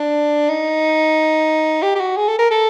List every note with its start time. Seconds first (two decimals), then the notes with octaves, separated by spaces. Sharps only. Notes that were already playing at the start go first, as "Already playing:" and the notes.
Already playing: D4
0.49 D#4
1.83 G4
1.95 G4
2.00 F#4
2.17 G#4
2.28 A4
2.39 A#4
2.51 A4